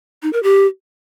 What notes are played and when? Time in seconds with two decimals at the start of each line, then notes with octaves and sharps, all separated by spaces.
0.23 D#4
0.33 A#4
0.43 G4